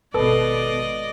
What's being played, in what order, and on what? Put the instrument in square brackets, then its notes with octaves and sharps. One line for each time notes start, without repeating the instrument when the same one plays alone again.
[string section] G#1 B2 [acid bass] A4 [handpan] B4 [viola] D5 D#5